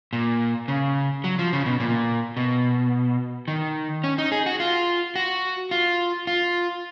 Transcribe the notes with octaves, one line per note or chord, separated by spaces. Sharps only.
A#2
C#3
F#3
F3
C#3
B2
A#2
B2
D#3
C#4
D#4
G#4
F#4
F4
F#4
F4
F4